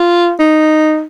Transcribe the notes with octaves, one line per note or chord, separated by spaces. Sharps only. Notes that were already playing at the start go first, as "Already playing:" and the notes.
Already playing: F4
D#4